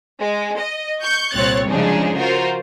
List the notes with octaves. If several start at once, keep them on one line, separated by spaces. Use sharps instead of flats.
G#3
D#5
C#6 G6
C2 A#2 C4 C#5 F#6 A6
C#3 F3 G#3 D4 D#4 G#4
F4 F#4 A#4 C5